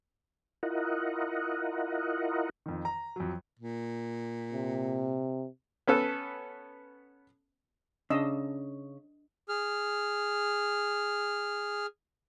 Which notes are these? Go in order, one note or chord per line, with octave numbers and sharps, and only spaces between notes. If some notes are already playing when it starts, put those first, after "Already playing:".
E4 F4 A#4 D#5 F#5
F2 D#3
A#5
F2 F#3
A#2
C3
B3 C#4 A4 B4
C#3 D4 D#5 E6
G#4 F6